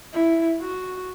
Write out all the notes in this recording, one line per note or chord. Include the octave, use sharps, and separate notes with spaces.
E4
F#4